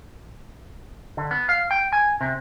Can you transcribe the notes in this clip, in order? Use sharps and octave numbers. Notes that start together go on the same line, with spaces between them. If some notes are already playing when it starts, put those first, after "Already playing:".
D3
B3
F5
G5
G#5
C3